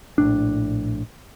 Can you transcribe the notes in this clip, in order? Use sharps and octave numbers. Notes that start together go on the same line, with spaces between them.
A#1 A2 D4